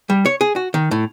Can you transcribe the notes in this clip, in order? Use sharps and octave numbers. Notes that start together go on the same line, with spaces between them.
G3
C#5
G#4
F#4
D#3
A2